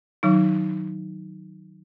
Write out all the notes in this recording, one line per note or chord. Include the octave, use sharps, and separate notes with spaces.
D#3 F#3 D#4